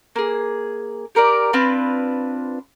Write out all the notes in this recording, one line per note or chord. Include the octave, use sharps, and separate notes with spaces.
A#3 G#4
G4 A#4 C#5 D5
C4 D4 F4 B4